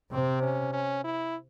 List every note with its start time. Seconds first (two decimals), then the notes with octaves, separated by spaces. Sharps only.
0.12 C3 C4
0.42 C#4
0.73 C#4
1.04 E4